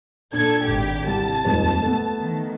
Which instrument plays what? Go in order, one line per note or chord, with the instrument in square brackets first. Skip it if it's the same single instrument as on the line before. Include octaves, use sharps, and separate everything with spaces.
[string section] A#2 A4 G#6 [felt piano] D4
[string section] G#1 G4
[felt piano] C2 [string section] A5
[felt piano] D#1 F2 G#2
A3 B3
[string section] D#3